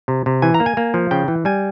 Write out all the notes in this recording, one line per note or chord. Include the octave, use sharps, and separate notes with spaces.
C3
C3
E3 G#5
A#5
A#3
G#5
A#3
F3
C#3 G5
E3
G3 G#5